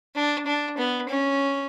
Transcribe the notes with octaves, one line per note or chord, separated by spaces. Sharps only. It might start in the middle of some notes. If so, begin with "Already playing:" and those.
D4
D4
B3
C#4